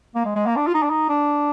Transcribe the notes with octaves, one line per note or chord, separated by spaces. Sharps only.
A#3
G#3
G#3
A#3
D4
F4
D#4
D4
D#4
D4